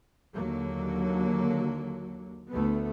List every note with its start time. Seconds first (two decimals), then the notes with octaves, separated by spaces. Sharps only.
0.34 D#2 D3 F#3 A#3
2.51 D2 A3 B3